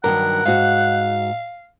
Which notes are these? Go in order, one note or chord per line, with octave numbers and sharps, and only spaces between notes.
G2 D#3 F#3 A#4 F#5
G#2 F#4 F5